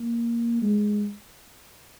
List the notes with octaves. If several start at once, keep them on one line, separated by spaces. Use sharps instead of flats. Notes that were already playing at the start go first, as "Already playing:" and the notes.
Already playing: A#3
G#3